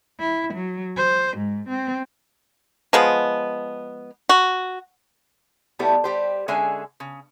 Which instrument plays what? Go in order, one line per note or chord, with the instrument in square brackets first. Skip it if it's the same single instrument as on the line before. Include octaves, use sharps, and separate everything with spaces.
[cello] E4
F#3
C5
G#2
C4
[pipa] F3 G#3 B3
F#4
[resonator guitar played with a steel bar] B2 G3 A3 B3 E4 G4
G3 G4 C5
D3 G#3 C#4 G#4 E5 G#5
C#3